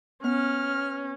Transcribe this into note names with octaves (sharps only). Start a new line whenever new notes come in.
B3 C#4 F6